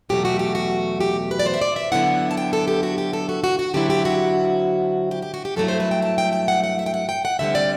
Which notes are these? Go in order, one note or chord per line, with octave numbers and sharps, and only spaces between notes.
E2 B2 F#3 A3 G4
F#4
G4
F#4
G4
B4
D5
C5
E5
D5
E5
D3 F#3 B3 E4 F#5
A5
G5
A4
G4
F#4
G4
A4
F#4
F#4
F#4
D3 F#3 C4 E4 G4
G4
F#4
G4
G4
F#4
G4
G2 F#3 A3 E4 A4
C5
B4
G5
A5
G5
G5
F#5
F#5
E5
G5
F#5
G5
F#5
D2 D3 G3 C4 E5
D5